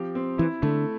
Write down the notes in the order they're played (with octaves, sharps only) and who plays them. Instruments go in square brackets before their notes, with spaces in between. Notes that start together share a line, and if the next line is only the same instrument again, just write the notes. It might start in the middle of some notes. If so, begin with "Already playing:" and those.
Already playing: [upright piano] F3 C4 G4
C4
[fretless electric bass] E3 [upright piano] E4
[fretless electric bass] D3 [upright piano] A3